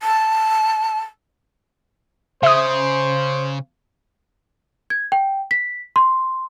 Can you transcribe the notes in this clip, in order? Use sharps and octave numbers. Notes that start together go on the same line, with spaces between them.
A5
C#3 C5 E5 D#6
G#6
G5
B6
C6